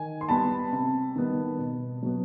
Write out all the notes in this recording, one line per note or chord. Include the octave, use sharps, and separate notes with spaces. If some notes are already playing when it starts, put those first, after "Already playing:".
Already playing: D#3 G#5
C6
G3 B3 A5 B5
C3
D#3 G3 B3
B2
F#3 B3